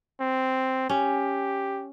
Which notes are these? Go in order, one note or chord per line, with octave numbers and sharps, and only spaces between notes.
C4
C#4 G4